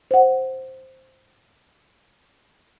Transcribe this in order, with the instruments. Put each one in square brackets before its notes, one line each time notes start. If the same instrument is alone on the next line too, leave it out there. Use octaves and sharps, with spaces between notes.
[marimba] C5 F#5